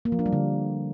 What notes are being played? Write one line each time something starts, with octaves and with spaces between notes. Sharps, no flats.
A#3
F3
D4
G3
D3